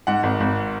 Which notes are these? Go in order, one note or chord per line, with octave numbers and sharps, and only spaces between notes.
G#2 F#5
G#1
G#1